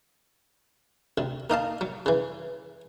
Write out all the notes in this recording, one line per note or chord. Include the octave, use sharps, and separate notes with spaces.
D2 C3
A#3 D#4 F5 A5
F#3
C#3 E3